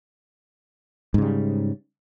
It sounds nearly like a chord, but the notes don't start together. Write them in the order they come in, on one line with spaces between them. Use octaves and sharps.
G#2 C#3 G3